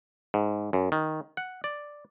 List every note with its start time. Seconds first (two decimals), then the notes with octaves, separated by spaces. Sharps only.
0.34 G#2
0.73 F#2
0.92 D#3
1.37 F#5
1.64 D5